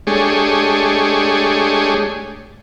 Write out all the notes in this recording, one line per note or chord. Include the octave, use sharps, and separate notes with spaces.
G#3 A3 D4 G4 G#4 C#5